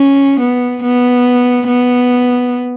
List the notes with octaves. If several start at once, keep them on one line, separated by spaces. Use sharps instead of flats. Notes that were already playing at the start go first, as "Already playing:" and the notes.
Already playing: C#4
B3
B3
B3